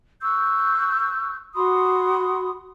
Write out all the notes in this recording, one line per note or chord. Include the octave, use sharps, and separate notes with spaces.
C#6 E6 F#6 G6
F#4 B5 C6 D#6